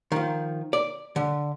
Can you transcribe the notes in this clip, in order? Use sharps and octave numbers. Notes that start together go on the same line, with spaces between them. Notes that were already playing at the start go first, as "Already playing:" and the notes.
D#3 F3
D5
D3